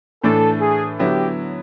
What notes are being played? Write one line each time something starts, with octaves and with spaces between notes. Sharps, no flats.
A2 E3 A3 D4 A4
G#4
D3 F#3 B3 E4 G4